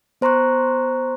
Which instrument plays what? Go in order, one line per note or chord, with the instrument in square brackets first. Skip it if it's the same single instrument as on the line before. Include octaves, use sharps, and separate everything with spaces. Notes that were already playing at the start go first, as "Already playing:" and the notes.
[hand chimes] B3 C5 A#5 C6 C#6 F#6